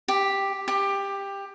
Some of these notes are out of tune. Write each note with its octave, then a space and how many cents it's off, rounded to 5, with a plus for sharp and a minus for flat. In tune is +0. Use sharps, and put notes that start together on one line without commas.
G4 +5
G4 +15